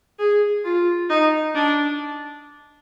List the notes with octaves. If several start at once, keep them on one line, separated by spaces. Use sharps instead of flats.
G#4
F4
D#4
D4